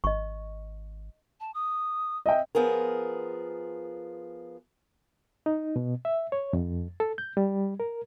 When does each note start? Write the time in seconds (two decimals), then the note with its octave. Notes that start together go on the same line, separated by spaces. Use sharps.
0.04 G#1 D#5 C#6
1.40 A5
1.54 D#6
2.26 D#5 E5 G5
2.55 F3 B3 G#4 A#4
5.46 D#4
5.76 B2
6.05 E5
6.32 C#5
6.53 F2
7.00 A4
7.18 G6
7.37 G3
7.80 A#4